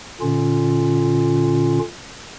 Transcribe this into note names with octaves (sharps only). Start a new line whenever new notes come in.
A#2 D3 C#4 F4